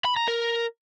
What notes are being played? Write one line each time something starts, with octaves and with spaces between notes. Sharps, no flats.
B5
A#5
A#4